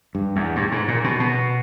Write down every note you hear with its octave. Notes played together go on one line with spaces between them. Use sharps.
G2
E2
G2
G#2
A#2
B2
B2